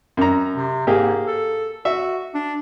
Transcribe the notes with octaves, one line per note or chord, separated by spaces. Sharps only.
F#2 A#5
C3
G#2 A#3 G4 G#4
A4
F#4 E5
D4